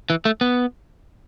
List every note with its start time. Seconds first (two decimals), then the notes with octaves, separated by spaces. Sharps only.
0.10 E3
0.25 A3
0.41 B3